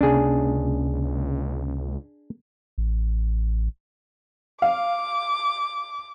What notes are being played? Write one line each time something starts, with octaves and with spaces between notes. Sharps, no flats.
C#2 C3 A#3 C#4 D4 G#4
A1
F5 D6